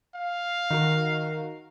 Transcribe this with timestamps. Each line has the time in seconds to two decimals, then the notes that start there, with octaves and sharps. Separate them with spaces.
0.15 F5
0.70 D#3 F#4 A#4